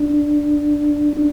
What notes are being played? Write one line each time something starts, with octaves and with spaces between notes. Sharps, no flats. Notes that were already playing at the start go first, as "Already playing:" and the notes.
Already playing: D4
D4